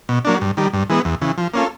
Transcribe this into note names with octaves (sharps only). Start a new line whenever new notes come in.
B2
F#3 A#3 D4
G2
D#3 G3
G2
E3 G#3 B3
E2
C#3 E3
F3
A#3 C#4 F4 A4